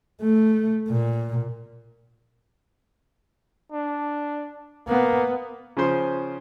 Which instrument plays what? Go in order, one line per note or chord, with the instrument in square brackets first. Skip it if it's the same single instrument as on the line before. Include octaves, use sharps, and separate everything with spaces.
[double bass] A3
A#2
[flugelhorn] D4
[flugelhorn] A#3 [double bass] B3
[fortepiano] C#3 F3 C#4 C5 C6